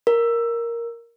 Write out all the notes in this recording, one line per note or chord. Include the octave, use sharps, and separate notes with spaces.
A#4